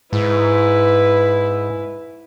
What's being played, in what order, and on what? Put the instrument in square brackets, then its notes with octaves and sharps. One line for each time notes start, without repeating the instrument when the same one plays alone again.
[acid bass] G#2 [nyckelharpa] E4 B4